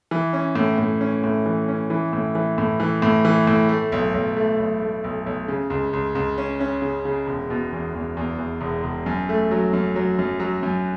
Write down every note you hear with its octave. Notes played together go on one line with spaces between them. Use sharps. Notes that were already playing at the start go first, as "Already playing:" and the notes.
E3
C#4
A2
A2
C#4
A2
E3
C#4
E3
A2
E3
A2
E3
A2
E3
A2
A3
B1
B1
A3
B1
A3
B1
B1
C#3
C#2
C#2
C#2
C#4
C#4
C#3
C#3
E1
B2
E2
E2
E2
E2
E1
E1
F#2
A3
F#3
F#2
F#3
F#2
F#3
F#2